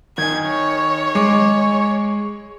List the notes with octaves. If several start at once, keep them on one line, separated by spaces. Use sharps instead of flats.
D#3 G#5 G#6
C#5
G#3 D6